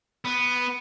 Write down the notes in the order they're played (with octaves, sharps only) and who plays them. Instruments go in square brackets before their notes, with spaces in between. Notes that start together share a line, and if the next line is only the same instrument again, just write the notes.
[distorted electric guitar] B3